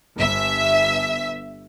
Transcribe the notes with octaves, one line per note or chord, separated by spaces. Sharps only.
G1 E5